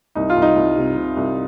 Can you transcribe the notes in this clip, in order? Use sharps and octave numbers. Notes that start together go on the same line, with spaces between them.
C2 D#4
F4
C2
D#4
C2
C3
C3
C2